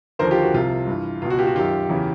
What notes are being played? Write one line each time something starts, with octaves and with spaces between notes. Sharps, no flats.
D#2 D3 F3 A#4 C5
F4 G4
F#4
C2 C3 F3 F4
G2 E3
C#2 B2 F4
F#4
F4 G4
F#4
F#2 D#3 F4 G4
E2 C#3 E3